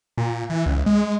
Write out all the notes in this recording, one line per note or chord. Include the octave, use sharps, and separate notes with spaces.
A#2
E3
C#2
G#3